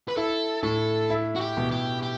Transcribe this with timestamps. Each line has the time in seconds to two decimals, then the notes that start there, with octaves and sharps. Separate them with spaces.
0.08 B4
0.17 E4 A4
0.63 A2 A4
1.10 E4
1.35 F#4
1.41 G4
1.57 B2
1.72 G4
2.02 G4